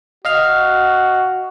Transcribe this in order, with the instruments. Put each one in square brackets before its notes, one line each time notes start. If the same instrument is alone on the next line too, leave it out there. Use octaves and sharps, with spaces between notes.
[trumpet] F#4 [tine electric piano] D#5 F5 F6